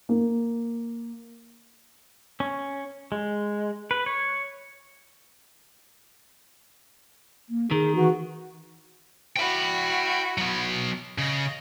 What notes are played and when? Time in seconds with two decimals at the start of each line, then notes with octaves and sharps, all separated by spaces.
0.09 A#3
2.40 C#4
3.12 G#3
3.91 B4
4.06 C#5
7.49 A#3
7.71 D#3 G#4
7.95 E3 F#4
9.36 E4 F#4 G5 B5
10.38 F#3 B3
11.18 C#3 D#5